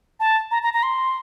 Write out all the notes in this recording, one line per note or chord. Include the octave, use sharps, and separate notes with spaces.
A5
A#5
A#5
A#5
C6